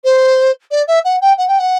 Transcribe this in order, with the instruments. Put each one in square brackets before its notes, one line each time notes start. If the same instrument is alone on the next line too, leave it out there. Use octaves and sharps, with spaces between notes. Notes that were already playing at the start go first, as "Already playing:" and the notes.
[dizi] C5
D5
E5
F#5
G5
F#5
G5
F#5